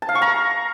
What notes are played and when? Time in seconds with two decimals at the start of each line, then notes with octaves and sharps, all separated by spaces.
0.02 A5
0.09 F5
0.15 C#6
0.22 A#5